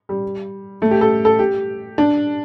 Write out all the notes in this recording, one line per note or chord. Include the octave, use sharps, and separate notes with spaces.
G3
A3
G4
A4
A4
G4
D4